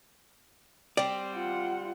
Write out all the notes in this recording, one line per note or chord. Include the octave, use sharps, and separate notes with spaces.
G3 C4 D5
F4 F#5